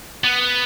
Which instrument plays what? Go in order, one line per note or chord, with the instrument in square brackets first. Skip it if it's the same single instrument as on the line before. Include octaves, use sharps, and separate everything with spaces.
[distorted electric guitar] B3